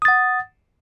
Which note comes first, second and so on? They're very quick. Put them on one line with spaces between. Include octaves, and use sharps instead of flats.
D#6 A6 F#5